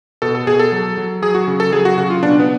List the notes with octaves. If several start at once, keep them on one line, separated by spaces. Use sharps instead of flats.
B2 A4
A4
B2 G#4
A4
F#3
F#3
F#3 G#4
F#4
C#3
A4
F#3 G#4
F#4
C#3 F#4
F4
B2 D4
B3